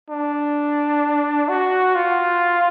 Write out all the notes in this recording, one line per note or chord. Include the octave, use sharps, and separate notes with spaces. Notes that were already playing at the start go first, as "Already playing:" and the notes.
D4
F#4
F4